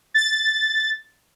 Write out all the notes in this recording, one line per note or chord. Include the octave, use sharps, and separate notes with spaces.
A6